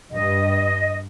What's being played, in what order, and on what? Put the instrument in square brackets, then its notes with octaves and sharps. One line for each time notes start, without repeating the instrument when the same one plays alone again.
[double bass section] G2 [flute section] D#5